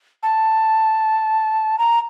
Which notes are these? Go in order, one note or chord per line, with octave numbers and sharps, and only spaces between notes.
A5
A#5